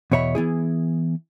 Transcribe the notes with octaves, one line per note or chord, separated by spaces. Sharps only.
E2 B2 C#5 E5 B5
E3 B3 E4 G#4